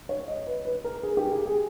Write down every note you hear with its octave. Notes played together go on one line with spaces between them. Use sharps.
C#5
D#5
B4
B4
A#4
G#4
G4
G#4
G#4